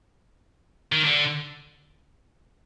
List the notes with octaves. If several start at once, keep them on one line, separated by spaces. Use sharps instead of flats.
D#3
D3